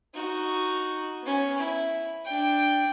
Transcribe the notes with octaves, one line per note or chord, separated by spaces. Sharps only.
D#4 F#4
B3 C#4
E4
D4 G5